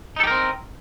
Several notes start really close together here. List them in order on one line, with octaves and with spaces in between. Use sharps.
D#4 A4 G4 A#4 C4